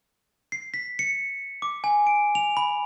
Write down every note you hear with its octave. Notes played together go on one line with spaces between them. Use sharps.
C7
B6
C#7
D6
G#5
D7
F7
B5